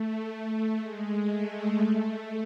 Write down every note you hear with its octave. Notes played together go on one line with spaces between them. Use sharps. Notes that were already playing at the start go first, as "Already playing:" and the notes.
Already playing: A3
G#3
A3
A3